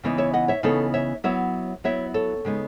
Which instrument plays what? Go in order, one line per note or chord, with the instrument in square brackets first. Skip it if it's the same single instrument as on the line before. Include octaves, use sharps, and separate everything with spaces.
[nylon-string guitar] C#3 E3 B3 D#4
C#5 E5
D#5 F#5
C#5 E5
C#3 E3 B3 D#4 A4 C#5
C#5 E5
F#3 B3 E4 C#5 E5
F#3 B3 E4 C#5 E5
A4 C#5
C#3 G#3 B3 D#4